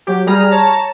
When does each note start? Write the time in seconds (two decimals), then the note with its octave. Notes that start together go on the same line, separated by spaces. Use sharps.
0.07 F#3 G4
0.27 G3 G#4 A#5 F6
0.51 C#5 A5 A#5